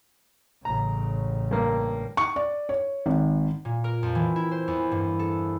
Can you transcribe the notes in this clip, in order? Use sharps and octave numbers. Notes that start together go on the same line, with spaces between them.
A1 C#3 A#5
G2 A#3
C#6
D5
C#5
G#1
A#2
A#4
F2
E3
E4
C5
E2
G2
A4